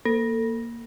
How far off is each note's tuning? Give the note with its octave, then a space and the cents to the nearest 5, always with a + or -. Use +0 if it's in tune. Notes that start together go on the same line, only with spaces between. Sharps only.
A#3 +0 A4 +25